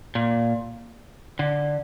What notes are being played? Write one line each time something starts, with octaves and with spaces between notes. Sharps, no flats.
A#2
D3